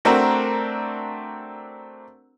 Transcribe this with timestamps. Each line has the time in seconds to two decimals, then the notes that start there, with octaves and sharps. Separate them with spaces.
0.05 A3 C4 D4 F#4 A#4